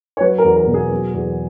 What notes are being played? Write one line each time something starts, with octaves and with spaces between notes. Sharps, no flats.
C#5
F#3 B4
A#4
E2
A#4
B2
G#4
F#3
E2